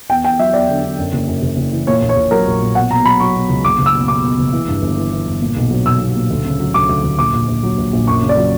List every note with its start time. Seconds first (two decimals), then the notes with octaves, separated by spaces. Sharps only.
0.10 E2 G5
0.25 E2 G5
0.39 F#3 E5
0.53 E2 D5
0.69 D3
0.84 D3
0.99 F#2
1.13 F#1
1.27 F#2
1.42 F#1
1.57 F#1
1.72 E3
1.87 A#2 C#5
2.02 A#1
2.09 C#5
2.16 A#1
2.31 F#3 A#4
2.46 A#1
2.61 A#2
2.75 B2 F#5
2.91 B2 A#5
3.05 F#3 B5
3.20 F#3 C#6
3.35 B2
3.49 C#2
3.64 F#1 D6
3.78 F#1
3.86 E6
3.94 B2
4.08 B2 D6
4.23 B2
4.39 F#1
4.52 E3
4.68 G2
4.82 G1
4.97 E3
5.13 E3
5.27 G1
5.41 A#2
5.56 B1
5.71 F#3
5.86 B1 E6
6.00 B1
6.16 A#2
6.30 D2
6.45 C#3
6.60 F#3
6.74 D2 D6
6.89 D2
7.04 D2
7.19 A#1 D6
7.33 A#1
7.48 A#1
7.63 F#3
7.78 A#1
7.93 A#1
8.07 F#2 C#6
8.22 C#3
8.29 D5
8.37 F#3